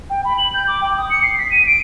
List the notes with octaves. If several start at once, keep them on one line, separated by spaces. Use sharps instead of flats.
G5
B5
F#7
G6
D6
G5
D#6
C#7
C7
B6
D#7
D7